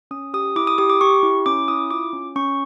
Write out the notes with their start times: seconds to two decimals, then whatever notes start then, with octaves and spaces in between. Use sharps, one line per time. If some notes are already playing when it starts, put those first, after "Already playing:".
0.11 C#4 D#6
0.34 G4 D#6
0.56 E4 D6
0.67 D#6
0.78 G4 D#6
0.90 D6
1.01 G4 C#6
1.23 E4
1.46 C#4 D6
1.68 E4 D#6
1.91 F4 D6
2.13 C#4
2.36 C#4 C#6